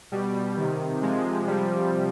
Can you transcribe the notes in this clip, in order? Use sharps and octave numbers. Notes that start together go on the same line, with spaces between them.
B2 G3
C3 D#3
C3 F3 G#3
C3 F3 G3